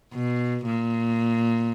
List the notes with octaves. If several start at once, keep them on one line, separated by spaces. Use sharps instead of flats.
B2
A#2